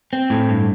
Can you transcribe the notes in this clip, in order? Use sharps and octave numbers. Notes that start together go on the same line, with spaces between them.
C4
A2
G2